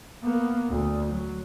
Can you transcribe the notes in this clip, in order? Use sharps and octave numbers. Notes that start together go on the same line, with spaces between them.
A#3 B3
D2
F#3